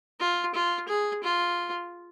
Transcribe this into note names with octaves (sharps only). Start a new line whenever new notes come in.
F4
F4
G#4
F4